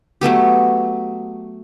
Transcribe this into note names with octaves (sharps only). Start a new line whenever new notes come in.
F#3 A3 B3 G4